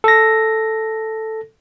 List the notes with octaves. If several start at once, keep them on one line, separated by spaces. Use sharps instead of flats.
A4 A#6